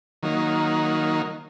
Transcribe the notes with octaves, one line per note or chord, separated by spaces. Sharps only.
D#3 F#3 A#3 D#4